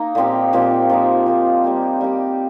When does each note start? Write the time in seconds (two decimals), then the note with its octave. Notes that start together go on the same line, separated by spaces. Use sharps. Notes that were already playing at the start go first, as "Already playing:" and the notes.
Already playing: A#3 D#4
0.15 A#2 F3 C4 G4
0.53 A#2 F3 C4 G4
0.90 F3 A#3 D#4
1.26 F3 A#3 D#4
1.64 G3 A#3 G4
2.01 G3 A#3 G4